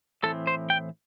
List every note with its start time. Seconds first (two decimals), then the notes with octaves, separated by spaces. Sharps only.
0.23 A2 E3 C4 A4
0.47 C5
0.70 G5